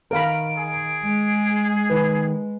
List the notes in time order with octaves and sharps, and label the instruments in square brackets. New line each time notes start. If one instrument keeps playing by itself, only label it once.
[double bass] D#3 [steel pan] A#4 F5 B5 [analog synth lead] D7
[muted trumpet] G#4
[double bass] G#3
[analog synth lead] D#3 [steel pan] B4